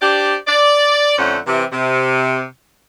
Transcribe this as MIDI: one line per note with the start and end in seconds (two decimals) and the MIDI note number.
0.02 0.35 62
0.02 0.35 67
0.02 0.35 72
0.02 0.35 74
0.48 1.15 74
1.18 1.39 41
1.18 1.39 50
1.18 1.39 57
1.18 1.39 61
1.18 1.39 72
1.18 1.39 78
1.47 1.64 48
1.47 1.64 52
1.72 2.44 48